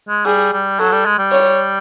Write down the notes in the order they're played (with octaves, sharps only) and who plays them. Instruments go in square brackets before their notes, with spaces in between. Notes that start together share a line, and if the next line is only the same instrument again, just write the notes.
[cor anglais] G#3
[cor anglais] G3 [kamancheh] G#4
[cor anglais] G3
[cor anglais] F#3 [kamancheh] A4
[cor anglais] G3
G#3
G3
[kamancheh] C#5